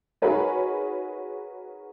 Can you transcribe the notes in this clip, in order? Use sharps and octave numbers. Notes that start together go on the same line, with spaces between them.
D#4 F#4 G#4 A#4 B4 C#5